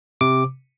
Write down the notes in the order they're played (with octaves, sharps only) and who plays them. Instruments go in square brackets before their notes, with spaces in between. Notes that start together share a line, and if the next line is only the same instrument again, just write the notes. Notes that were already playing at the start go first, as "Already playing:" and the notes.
[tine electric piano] C3 D6